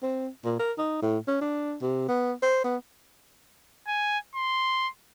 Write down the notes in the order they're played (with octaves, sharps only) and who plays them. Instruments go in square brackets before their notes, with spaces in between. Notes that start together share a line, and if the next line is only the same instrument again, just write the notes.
[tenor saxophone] C4
A#2
A#4
D#4
A2
C#4
D4
C3
B3
C5
B3
[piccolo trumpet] G#5
C6